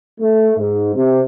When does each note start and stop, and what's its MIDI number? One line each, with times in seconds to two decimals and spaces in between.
0.21 0.52 57
0.57 0.92 44
0.95 1.21 48